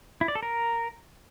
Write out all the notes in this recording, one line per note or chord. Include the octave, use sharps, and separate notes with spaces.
E4
D5
A4
A#4